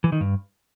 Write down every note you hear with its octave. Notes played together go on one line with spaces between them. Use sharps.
E3
D#3
G2